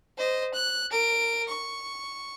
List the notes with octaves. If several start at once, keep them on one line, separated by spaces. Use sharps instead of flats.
C5 D#5
F#6
A#4 D7
C#6